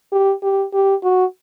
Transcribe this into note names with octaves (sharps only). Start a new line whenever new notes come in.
G4
G4
G4
F#4